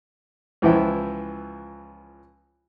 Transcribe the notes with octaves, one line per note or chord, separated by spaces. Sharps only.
C#2 E3 F3 E4 G5